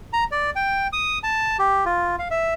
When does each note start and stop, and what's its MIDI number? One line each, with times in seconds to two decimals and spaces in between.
0.13 0.24 82
0.32 0.50 74
0.56 0.87 79
0.93 1.19 87
1.23 1.57 81
1.59 1.85 67
1.86 2.16 65
2.19 2.28 77
2.31 2.54 76